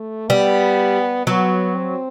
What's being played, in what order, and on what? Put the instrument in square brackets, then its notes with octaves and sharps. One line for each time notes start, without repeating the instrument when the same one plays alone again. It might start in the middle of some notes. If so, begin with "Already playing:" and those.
Already playing: [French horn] A3
[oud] G3 [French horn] B3
[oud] F#3 [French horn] B3
[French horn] C4